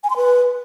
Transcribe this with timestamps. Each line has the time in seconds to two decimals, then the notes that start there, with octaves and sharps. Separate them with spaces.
0.04 G#5
0.10 C6
0.17 B4